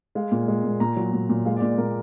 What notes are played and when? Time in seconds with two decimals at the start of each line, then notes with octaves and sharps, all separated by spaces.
0.15 G#3 F5
0.32 A#2
0.48 G#3
0.64 A#2
0.80 A#2 A#5
0.97 F#3
1.13 A#2
1.29 A#2
1.45 G#3 F5
1.56 D5
1.62 A#2
1.78 A#2 A#4